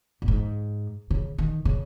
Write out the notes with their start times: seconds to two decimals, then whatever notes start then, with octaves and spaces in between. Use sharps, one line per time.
0.22 A#2
0.28 G#2
1.11 C#3
1.38 D#3
1.65 C#3